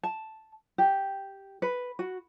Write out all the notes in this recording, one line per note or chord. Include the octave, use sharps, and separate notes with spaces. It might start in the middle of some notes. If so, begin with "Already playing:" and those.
A5
G4
B4
F#4